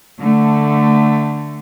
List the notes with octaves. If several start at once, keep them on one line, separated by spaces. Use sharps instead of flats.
D3 A3